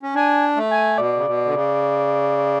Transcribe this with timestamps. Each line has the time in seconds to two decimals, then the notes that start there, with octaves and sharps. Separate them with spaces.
0.03 C#4
0.15 D4 G#5
0.56 A3
0.71 G#5
0.98 B2 D5
1.16 C#3
1.26 B2
1.46 D3
1.54 C#3